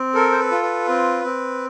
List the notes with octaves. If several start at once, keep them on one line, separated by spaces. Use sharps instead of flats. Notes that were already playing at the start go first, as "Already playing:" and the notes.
Already playing: C4
A4 A#4
C5
B4
F4
B4
C4
C4